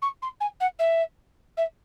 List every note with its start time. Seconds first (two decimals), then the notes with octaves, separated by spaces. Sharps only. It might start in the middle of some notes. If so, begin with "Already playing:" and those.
0.02 C#6
0.22 C6
0.40 G#5
0.60 F#5
0.79 E5
1.57 E5